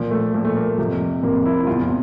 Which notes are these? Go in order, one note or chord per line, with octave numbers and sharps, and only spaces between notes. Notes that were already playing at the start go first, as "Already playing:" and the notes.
Already playing: A#2 F3
A3
A#2 F3 A3
A3
A#3
F2 C3 F3
F2 C3 F3 A#3
E4
E2 C3 F3 F4